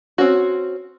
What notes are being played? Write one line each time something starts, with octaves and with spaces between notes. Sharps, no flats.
C4 C#4 F#4